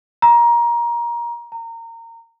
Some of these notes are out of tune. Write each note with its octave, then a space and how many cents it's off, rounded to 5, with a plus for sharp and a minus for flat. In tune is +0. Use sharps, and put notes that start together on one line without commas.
A#5 +20
A#5 -25